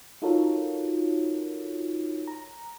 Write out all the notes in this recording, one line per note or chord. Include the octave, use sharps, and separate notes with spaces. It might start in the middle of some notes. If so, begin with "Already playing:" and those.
D#4 F4 F#4 A4 A#4 C#5
A#5